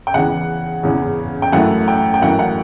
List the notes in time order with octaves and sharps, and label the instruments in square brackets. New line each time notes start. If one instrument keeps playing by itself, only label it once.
[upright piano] G5
E2 C#3 E3 F#5
E2 C#3 E3
G5
F#2 E3 A3 E4 F#5
G5
G5
F#2 E3 A3 E4 F#5
F#5